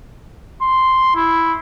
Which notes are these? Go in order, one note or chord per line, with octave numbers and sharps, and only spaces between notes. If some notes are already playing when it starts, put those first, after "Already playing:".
C6
E4